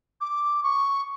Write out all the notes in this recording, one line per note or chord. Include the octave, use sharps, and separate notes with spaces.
D6
C#6